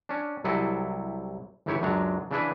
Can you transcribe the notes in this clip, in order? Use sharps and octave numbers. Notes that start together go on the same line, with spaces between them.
C#4 D4
C2 C3 F#3 E4 A4 D#5
G1 E2 D#3 E4 G4 C#5
C#2 F#2 F#3 G#3 D4 A#5
C#3 E3 D4 E4 G#4 B4